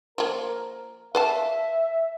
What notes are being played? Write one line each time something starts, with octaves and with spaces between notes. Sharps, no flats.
F3 A#3 A#4
B4 E5 F5 A5